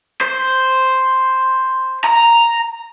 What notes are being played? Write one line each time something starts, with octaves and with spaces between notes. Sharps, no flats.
C5
A#5